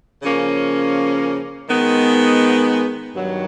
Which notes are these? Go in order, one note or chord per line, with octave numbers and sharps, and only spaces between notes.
C#3 F3 A#3 C#4
D#3 G#3 B3
G2 D#3 F#3